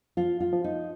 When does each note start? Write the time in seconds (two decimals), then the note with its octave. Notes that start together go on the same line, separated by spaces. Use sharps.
0.17 F3 F4
0.40 F4
0.53 F3
0.64 D#4